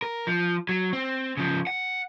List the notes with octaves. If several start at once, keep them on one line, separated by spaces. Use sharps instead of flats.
A#4
F3
F#3
C4
C#3 F3
F#5